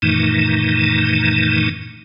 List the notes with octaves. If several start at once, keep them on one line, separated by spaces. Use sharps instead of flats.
F#2 A#2 D#3 E3 A3 D#4